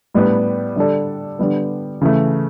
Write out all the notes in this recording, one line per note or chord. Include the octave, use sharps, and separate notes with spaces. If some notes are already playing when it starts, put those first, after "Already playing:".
A2 G3 B3 D4
D3 G3 D4 A4 D5
D3 G3 B3
C#3 E3 A3